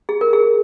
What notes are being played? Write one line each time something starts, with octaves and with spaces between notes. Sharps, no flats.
G#4
A#4
G#4